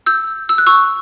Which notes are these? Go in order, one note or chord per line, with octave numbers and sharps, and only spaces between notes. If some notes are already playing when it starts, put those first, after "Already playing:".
E6 G6
E6
F#6
C#6 E6